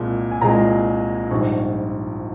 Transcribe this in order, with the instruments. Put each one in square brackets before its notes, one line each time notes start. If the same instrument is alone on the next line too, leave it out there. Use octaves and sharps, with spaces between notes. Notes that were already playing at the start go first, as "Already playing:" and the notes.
Already playing: [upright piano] C2 A#2 G#3
G#5
C2 A#2 G#3 A#5
A#1 G#2 G3 C#6